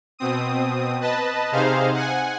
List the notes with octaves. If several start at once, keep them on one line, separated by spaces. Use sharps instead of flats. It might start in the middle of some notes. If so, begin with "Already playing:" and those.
B2 C4 D#6
B4 D#5 A5
C3 D#4 G#4 C5 F5
F#5 G#5